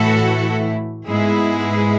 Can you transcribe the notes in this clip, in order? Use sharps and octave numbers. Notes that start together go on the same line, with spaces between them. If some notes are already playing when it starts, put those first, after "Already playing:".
Already playing: A2 E3 A3 E4 F#4 A4
G#2 G#3 B3 E4 G#4